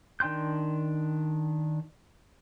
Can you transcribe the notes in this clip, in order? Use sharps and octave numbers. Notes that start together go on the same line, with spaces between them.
D#3 D4 G5 C6 G6